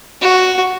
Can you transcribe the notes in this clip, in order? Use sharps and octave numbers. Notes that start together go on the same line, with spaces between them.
F#4